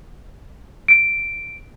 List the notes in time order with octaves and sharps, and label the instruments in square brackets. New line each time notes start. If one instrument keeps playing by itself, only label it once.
[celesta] D7